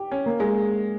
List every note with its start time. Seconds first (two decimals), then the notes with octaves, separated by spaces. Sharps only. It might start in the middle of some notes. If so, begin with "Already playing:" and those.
Already playing: G4
0.11 C#4
0.26 A#3
0.40 G#3